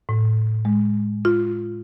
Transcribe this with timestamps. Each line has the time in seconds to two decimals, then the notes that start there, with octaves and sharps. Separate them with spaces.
0.09 A2
0.65 G#3
1.25 F4